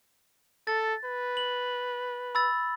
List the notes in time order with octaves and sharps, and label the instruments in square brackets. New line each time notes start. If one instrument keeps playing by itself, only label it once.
[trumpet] A4 [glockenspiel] A6
[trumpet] B4
[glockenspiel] F#7
B5 E6 A6